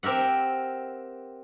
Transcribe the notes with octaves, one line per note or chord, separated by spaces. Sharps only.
C4 G4 A#4 E5 F#5